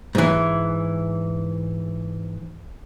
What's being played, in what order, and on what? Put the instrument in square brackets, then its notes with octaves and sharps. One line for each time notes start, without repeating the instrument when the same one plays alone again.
[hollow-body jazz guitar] G#2 E3